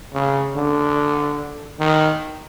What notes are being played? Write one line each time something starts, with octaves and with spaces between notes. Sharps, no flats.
C#3
D3
D#3